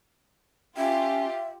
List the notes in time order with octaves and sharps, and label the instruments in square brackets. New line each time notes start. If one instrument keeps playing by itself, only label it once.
[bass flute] C#4 [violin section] F4 G4 [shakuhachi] E5